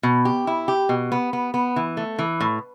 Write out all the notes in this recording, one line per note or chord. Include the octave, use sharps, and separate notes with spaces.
B2
G4
E4
G4
B2
B3
B3
B3
E3
A3
E3
A2